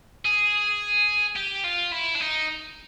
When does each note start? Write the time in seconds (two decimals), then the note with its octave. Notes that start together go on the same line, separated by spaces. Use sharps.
0.25 G#4
1.36 G4
1.64 F4
1.92 E4
2.15 D4
2.20 D#4